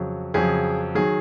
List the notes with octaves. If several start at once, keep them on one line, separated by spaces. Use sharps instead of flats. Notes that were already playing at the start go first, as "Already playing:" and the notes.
Already playing: F2 C#3 F#3
F2 C#3 F#3 G#4
D#3 F#3 G#4